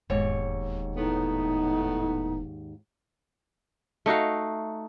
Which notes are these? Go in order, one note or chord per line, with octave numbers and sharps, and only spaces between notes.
E1 D#2 G#2 C#5
A2 B3 D#4
A3 D#4 F#4 F5